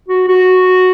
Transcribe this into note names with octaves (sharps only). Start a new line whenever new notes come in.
F#4
F#4